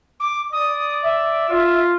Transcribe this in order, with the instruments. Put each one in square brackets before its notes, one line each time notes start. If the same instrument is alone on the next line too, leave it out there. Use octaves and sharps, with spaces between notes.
[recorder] D6
[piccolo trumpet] D5 [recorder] D#6
[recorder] E5
[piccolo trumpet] F4